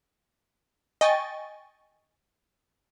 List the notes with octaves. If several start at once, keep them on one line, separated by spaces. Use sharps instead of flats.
D#5 G5 G#5 C#6 A6